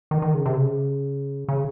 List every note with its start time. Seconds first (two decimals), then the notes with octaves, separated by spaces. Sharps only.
0.11 D#3
0.22 D#3
0.34 C#3
0.46 C3
0.57 C#3
1.49 C#3